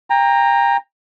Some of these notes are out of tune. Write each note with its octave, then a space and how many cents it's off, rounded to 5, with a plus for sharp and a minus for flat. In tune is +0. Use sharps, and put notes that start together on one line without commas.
G5 +30 A#5 +0